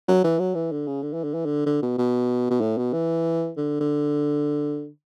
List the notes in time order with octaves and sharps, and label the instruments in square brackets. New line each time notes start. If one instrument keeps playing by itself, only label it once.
[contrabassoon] F#3
E3
F#3
E3
D3
C#3
D3
E3
D3
E3
D3
D3
B2
B2
B2
A2
B2
E3
D3
D3